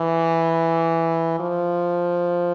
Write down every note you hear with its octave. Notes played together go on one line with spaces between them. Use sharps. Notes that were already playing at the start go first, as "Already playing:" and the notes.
Already playing: E3
F3